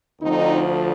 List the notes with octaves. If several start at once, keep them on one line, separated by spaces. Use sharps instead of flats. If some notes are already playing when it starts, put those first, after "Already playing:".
D2 D3 F3 C4 D#4